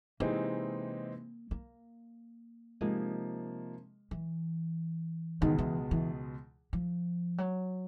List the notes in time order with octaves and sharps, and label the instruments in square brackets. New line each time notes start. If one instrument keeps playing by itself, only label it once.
[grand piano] C3 E3 G#3 C4 D#4 [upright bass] A#3
[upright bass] A#3
[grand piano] C3 F3 A#3 D#4 [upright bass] G#3
[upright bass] E3
[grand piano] C#2 B2 G#3 [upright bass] D#3
[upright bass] E3
E3
F3
F#3